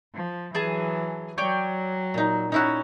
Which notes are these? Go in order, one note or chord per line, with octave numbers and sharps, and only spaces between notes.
F3
E3 F#3 G#4 G#5 A5
F#3 C#5 D5 G5
A#2 D#4
C#4 D#4 E4 F#4